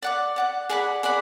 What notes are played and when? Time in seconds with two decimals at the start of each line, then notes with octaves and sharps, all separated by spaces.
0.02 D5 F#5 D6
0.36 D5 F#5 D6
0.69 G#4 D5 F#5 B5
1.03 G#4 D5 F#5 B5